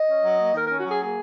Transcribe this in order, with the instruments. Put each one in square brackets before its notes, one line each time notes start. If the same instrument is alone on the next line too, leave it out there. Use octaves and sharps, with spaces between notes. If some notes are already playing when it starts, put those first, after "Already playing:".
Already playing: [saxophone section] D#5
C#4
F#3
A#3
D#3 A#4
C#4 A#4
F#4
F#3 G#4
A#3 G#4